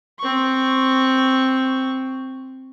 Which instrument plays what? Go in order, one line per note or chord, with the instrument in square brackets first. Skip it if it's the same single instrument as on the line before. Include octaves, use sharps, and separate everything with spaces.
[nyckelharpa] C4 C#6